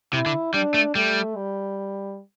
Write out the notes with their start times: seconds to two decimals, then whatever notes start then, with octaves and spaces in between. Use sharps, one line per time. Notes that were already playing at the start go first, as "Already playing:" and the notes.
0.13 C3 E4
0.26 D3
0.54 G3 D4
0.74 A3
0.95 G3 A3
1.36 G3